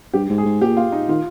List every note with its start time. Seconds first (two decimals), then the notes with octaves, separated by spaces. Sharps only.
0.14 G2 G4
0.30 G#2
0.38 G#4
0.45 G#2
0.61 A#2 G4
0.77 F4
0.92 D#4
1.08 D#3 F4